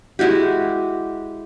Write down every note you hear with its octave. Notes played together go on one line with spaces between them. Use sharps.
G#3 E4 F#4 G4